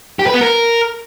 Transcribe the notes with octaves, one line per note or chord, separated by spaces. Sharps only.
G4
B4
B3
A#4